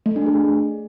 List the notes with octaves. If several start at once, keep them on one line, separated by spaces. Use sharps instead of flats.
A3
D4
G#4